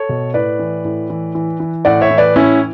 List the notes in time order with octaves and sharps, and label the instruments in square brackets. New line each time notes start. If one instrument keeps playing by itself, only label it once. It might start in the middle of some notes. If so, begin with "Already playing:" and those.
Already playing: [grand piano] A4 C#5
B2
A2 B4 D5
E3
A2
E3
E3
E3
A2 D5 F#5
C#5 E5
E3
B4 D5
A2 C#4 E4